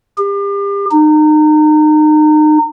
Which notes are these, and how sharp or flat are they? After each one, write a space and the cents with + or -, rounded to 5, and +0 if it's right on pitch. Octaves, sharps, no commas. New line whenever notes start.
G4 +35
D#4 -30